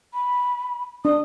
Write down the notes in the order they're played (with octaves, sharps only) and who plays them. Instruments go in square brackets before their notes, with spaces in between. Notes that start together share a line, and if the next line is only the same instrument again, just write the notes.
[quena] B5
[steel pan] D4 [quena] D#6